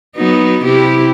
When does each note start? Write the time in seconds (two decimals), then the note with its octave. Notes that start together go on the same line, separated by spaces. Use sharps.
0.16 F#3 B3 D#4
0.64 C3 E4 G4